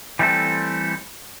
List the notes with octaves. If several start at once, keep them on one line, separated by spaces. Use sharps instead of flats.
E3 G3 A3 C4 A4